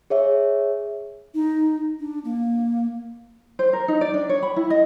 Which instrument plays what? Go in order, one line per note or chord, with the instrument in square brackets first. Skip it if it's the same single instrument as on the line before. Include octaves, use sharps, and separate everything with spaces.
[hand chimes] G#4 C#5 E5
[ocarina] D#4
D4
A#3
[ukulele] C5
A#4
D#4
D5
D4
C#5
B5
E4
D#5